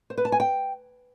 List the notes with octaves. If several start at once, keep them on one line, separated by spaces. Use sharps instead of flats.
C5
B4
A5
G#5
G5